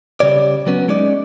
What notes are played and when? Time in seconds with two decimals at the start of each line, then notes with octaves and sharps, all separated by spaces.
0.20 C#3 G3 C#5 D5
0.67 F#3 B3 C#4
0.88 G#3 C#4 D#4 D5